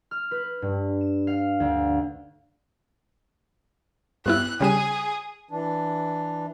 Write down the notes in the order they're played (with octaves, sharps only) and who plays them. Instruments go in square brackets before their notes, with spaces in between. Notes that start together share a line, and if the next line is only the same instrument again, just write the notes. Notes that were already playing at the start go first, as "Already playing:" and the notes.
[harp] F6
B4
G2
E7
F5
D2
[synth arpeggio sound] G2 B3 E4 [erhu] F#6
[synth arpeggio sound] C#3 G3 D#7 [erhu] G#4
[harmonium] E3 D4